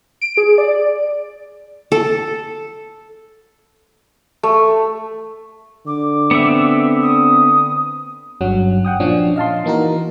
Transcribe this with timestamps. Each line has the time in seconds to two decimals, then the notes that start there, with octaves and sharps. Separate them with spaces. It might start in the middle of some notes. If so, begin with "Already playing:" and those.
0.21 D7
0.37 G#4
0.58 D5
1.92 A4
4.43 A3
5.87 D3 D6
6.31 B3 C4 E5
7.03 D#6
8.41 G1 G2 F#3 C#4 F#5
8.85 F#5 G5 D#6
9.00 A#2 F3 C#4 D4
9.36 D#5 F5 A5 C6
9.64 E3 A#3 D#4 F#4 A#4